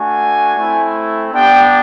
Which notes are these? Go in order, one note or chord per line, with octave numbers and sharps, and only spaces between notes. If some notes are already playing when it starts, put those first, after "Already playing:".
Already playing: A3 D4 F#4 G#5
A3 C4 E4
B3 D4 G4 G5